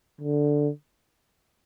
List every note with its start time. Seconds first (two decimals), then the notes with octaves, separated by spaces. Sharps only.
0.21 D3